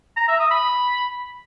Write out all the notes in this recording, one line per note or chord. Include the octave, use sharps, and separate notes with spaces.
A#5
E5
D#6
B5